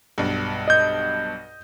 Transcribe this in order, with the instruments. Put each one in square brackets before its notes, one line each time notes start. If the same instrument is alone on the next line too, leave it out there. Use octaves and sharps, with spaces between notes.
[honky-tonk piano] B1 G2
[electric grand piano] D#5 G6